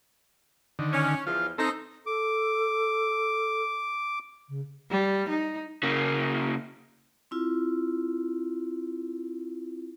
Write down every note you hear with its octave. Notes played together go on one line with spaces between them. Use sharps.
D3 D#3
C#4
E2 F3 F4
C4 D#4 A4 A#5
A4 D6
C#3
G3
D#4
C#3 A#3
C4 E4 F4